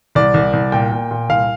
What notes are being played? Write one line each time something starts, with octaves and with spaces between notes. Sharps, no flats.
C2 D5
C2
C2
A#2 G5
A#2
A#2
C2 F5